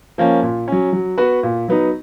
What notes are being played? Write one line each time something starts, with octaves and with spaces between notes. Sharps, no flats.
F3 A#3 C#4
A#2
F#3 C#4
F#3
B3 F#4 B4
A#2
F#3 B3 D#4